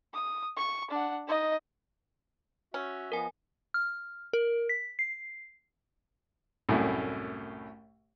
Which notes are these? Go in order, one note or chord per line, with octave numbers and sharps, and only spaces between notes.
D#6
C#6
D4 F#5
D#4 D#5
C#4 F#4 E5
F3 B3 A#4 D#5 G#5
F6
A#4
B6
C7
C2 F#2 A2